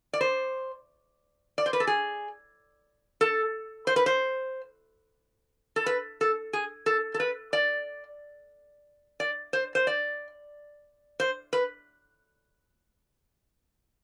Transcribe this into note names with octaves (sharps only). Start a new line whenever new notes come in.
D5
C5
D5
C5
B4
A4
G#4
A4
C5
B4
C5
A4
B4
A4
G#4
A4
A4
B4
D5
D5
C5
C5
D5
C5
B4